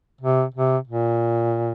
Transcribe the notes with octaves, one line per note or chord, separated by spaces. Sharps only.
C3
C3
A#2